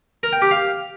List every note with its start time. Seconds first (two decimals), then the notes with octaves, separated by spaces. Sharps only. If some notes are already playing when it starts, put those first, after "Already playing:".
0.23 A#4
0.33 G5
0.42 G4
0.51 F5